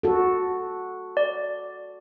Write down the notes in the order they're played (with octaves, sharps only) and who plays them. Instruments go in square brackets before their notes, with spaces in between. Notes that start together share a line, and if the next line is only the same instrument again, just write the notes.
[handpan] F#4 A4
[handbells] D5